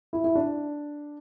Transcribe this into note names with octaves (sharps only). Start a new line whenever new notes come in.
E4
E4
D4